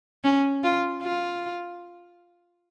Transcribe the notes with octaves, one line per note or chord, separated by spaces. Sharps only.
C#4
F4
F4